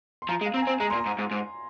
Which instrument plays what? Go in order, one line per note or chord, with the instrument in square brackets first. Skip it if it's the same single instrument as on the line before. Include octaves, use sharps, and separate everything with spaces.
[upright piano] C6
[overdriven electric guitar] F3 [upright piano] A#5
[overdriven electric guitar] G#3
[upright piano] F5
[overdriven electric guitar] C4 [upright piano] A#5
[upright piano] G#5
[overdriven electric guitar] C4
[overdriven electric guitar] G#3 [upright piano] A#5
[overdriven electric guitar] A#2 [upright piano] C6
[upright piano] A#5
[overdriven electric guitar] G#2
G#2
G#2